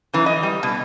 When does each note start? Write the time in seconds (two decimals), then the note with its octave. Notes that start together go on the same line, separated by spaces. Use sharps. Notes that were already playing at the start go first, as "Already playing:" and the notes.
0.13 F#2 E3
0.26 D#5
0.43 G3
0.63 B2